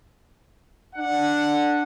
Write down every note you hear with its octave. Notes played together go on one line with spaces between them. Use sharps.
D4 F#5